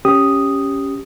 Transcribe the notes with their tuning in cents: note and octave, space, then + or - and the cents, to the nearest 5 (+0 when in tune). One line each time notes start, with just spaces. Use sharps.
C#4 +0 G4 +0 D#6 +0